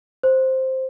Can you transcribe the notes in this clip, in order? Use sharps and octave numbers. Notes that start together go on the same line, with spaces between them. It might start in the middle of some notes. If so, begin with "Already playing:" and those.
C5